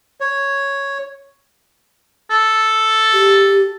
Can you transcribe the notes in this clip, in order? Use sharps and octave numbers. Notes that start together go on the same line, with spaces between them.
C#5
A4
G4